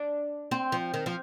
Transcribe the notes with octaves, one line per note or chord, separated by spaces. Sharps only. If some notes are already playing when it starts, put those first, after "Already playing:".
Already playing: D4
C4
F3
D#3
F3